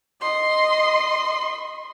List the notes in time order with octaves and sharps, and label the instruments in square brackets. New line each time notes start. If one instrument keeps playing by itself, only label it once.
[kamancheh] D#5 C6